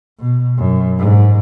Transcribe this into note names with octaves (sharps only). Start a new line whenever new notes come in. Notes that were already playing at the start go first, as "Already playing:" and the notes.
B2
F#2
G#2